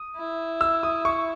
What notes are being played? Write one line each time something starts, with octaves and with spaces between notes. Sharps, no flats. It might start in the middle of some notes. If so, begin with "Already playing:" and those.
Already playing: D#6
E4
E6
D#6
C#6